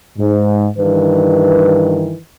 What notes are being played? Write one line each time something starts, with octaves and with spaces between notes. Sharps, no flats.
G#2
G2 D#3 E3 B4